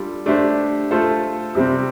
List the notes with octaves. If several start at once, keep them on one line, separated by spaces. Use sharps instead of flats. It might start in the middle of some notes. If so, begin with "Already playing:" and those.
Already playing: G3 D4 F4 A4
A3 D4 G4 C5
A3 F4 A4 C5
C3 G3 C4